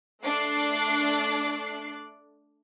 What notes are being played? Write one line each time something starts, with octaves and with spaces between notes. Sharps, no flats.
A3 D4 D6 F#6 C7